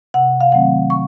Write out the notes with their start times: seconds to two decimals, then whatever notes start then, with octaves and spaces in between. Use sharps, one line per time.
0.14 C3 F#5
0.41 F5
0.52 D#3 F#3 A3 C4 F#5
0.90 C#6